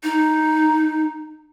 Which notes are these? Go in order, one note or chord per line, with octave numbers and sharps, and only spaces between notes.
D#4